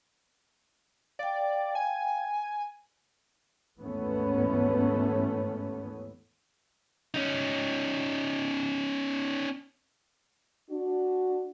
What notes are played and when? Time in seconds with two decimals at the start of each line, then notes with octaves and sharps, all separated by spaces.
1.19 D5 F5 G5
1.75 G#5
3.81 D#2 G#2 E3 A3 B3 C#4
7.14 C#4 D#4
10.70 D4 F#4